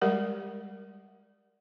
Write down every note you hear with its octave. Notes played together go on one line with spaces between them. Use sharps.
G3 G#3 G4 A#4 D5 F#5